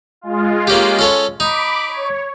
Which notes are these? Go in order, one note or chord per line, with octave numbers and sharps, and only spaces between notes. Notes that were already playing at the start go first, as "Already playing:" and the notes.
G#3 F4
A#3 C#4 G4
C#4 A4 C#5
D#4 B5 D6
C#5